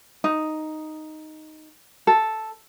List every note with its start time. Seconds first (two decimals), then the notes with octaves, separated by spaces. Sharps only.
0.24 D#4
2.07 A4